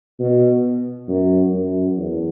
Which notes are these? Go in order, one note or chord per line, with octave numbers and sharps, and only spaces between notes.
B2
F#2
F#2
E2